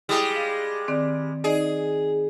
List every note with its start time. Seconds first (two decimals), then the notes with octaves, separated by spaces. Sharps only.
0.09 G3 G#3 E4 G5 D#6
0.36 F5
0.88 D#3 C4 D5
1.44 D#4 G#4 D5 D#5